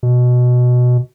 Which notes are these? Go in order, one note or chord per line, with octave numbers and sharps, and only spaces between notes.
B2